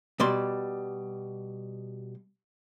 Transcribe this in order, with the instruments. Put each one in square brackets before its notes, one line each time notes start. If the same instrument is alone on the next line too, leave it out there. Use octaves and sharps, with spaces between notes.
[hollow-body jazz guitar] B2 G3 D5 C6